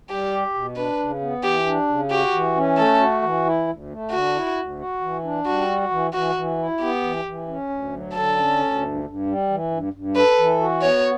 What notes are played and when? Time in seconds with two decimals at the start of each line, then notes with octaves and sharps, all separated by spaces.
0.09 G3 G4
0.32 G4
0.54 B2
0.76 D4 B4
0.99 C#3
1.21 B3
1.43 E3 G4
1.66 D4
1.88 C#3
2.10 F#4 G4
2.33 E3
2.56 C#4
2.77 A3 A4
3.00 F#4
3.22 E3
3.45 E4
3.67 D2
3.90 A3
4.11 D3 F#4
4.34 E4
4.57 D2
4.79 F#4
5.01 E3
5.24 D4
5.46 G3 F#4
5.68 F#4
5.91 E3
6.13 E3 F#4
6.35 E3
6.58 E4
6.80 B3 G4
7.02 E3
7.25 E3
7.48 C#4
7.69 D2
7.92 F#3
8.14 D3 A4
8.37 C#4
8.58 D2
8.82 G2
9.04 G2
9.26 G3
9.49 E3
9.71 G2
9.93 G2
10.16 A4 B4
10.38 E3
10.60 F#4
10.82 B3 C#5